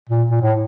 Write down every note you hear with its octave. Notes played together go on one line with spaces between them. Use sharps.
A#2
A#2
A2